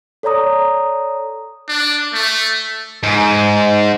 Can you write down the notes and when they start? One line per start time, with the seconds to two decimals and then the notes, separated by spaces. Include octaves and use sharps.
0.23 A4 C#5 D5 A#5 D#6
1.68 D4
2.13 A3
3.03 G#2